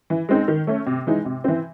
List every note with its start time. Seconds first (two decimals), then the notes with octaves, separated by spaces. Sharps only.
0.10 E3
0.29 G#3 C4 D#4
0.48 D#3
0.67 A3 C#4
0.86 C3
1.07 E3 G#3 D#4
1.25 C3
1.44 E3 C4